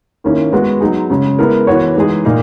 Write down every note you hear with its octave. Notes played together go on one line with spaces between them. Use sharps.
D#3 A#3 C#4 E4
G#3 B3 F#4 B4
F#3 B3 D#4 G#4
C#3 G#3 C#4
G#3 B3 E4 A#4
E3 B3 F#4 C#5
E3 G#3 D#4 G#4
A#2 A#3 D#4